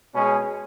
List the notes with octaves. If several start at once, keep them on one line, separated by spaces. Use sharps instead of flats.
B2 G#3 C#4 G#4